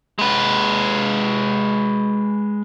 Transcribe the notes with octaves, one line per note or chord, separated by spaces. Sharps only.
G#3 B4